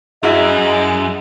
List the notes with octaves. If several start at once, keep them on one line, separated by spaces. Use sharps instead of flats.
F#2 E4 F#4 G#4 D#5 E5